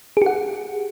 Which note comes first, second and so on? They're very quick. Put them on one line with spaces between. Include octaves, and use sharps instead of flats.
G#4 G4 F#5